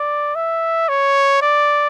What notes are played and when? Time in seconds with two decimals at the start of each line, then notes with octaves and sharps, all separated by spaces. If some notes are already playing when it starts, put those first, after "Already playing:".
Already playing: D5
0.36 E5
0.89 C#5
1.42 D5